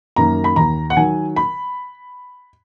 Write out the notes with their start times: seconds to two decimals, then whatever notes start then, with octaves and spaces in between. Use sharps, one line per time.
0.16 F#2 D#3 F#3 A#3 A#5
0.44 B5
0.56 D#2 A#5
0.90 F#5
0.97 D#3 F#3 G#5
1.36 B5